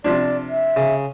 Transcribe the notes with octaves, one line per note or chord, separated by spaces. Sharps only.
C3 F3 D4 D5
E5
C#3